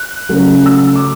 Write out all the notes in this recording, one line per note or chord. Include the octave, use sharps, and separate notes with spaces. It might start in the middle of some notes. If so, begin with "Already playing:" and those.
Already playing: F#6
C#3 F#3 A3
E6
D6